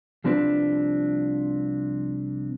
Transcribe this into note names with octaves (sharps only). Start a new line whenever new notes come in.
C2 F3 C4 D4 B4